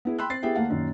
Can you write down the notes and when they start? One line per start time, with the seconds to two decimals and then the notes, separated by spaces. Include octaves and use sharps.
0.05 B3 E4 G#4
0.19 G5 B5 C6 E6 F#6
0.30 C4 A6 C7
0.43 B3 E4 G4 G#4 E5 G5
0.55 D#2 A3 A#3 F5 F#5
0.70 F#2 A#2 D#3